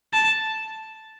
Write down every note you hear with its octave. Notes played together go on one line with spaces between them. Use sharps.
A5